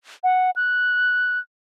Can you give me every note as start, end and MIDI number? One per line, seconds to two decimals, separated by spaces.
0.24 0.51 78
0.56 1.39 90